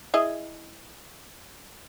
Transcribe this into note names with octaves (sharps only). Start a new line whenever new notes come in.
E4 G#4 D#5